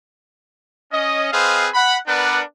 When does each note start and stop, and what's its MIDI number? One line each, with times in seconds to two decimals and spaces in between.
0.92 1.29 61
0.92 1.29 75
1.32 1.67 60
1.32 1.67 68
1.32 1.67 71
1.32 1.67 72
1.32 1.67 75
1.32 1.67 77
1.74 1.97 78
1.74 1.97 83
2.07 2.41 59
2.07 2.41 62
2.07 2.41 70
2.07 2.41 71
2.07 2.41 74
2.07 2.41 78